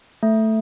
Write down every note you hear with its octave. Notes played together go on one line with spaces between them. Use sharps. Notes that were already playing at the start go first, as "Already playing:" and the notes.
A3